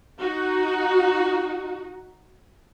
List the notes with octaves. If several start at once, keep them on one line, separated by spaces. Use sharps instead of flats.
D#4 F#4